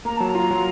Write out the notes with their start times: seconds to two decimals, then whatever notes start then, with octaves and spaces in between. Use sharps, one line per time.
0.05 A#3 A#5
0.17 F#3 A5
0.29 A#5
0.35 F4
0.51 F#3